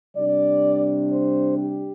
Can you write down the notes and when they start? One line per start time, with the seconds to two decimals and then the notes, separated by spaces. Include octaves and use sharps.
0.16 C3 G3 D4 D5
1.11 C5
1.57 G4